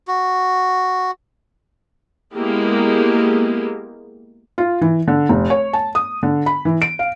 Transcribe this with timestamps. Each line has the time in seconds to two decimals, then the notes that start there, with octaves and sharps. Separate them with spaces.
0.08 F#4
2.34 G#3 A#3 B3 E4 G4
4.58 F4
4.81 E3
5.08 D3
5.29 F1
5.50 C#5
5.73 A5
5.95 D#6
6.23 D3
6.46 B5
6.65 E3
6.82 D7
6.99 F5